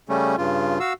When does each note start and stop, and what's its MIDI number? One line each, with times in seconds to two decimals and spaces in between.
0.09 0.36 49
0.09 0.36 55
0.09 0.36 57
0.09 0.36 61
0.38 0.79 43
0.38 0.79 49
0.38 0.79 65
0.80 0.93 66
0.80 0.93 77
0.80 0.93 88